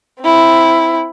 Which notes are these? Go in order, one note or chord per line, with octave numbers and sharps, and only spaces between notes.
C4 E4